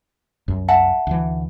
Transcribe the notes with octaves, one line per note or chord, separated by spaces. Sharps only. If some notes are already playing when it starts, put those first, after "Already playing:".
C2 F#2
E5 F#5 A5
D2 E3